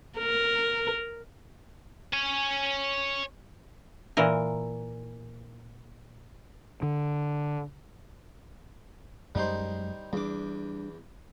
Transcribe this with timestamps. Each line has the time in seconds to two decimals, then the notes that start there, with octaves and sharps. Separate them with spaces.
0.19 A#4
2.13 C#5 G#5
4.17 A#2 E3 A#4
6.82 D3
9.35 F#2 G3 G#3 D#4 C5
10.13 E2 G3 D4 D6